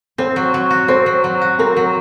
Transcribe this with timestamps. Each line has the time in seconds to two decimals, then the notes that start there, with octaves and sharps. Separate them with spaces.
0.18 C4 C5
0.36 F#3
0.54 F#3
0.71 F#4
0.88 C4 C5
1.06 F#3
1.24 F#3
1.42 F#4
1.59 C4 A#4
1.76 F#3